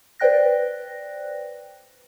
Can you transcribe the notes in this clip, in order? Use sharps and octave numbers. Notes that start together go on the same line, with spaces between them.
B4 C5 D5 G5 F#6 A#6